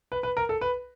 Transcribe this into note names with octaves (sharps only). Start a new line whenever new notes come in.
B4
B4
A#4
A4
B4